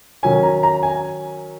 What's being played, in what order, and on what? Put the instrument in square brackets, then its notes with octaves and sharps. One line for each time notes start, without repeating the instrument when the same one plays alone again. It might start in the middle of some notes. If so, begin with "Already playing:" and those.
[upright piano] D#3 F#3 C#4 G#5
A#5
A#5
G#5